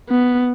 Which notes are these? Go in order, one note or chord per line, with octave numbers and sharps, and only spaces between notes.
B3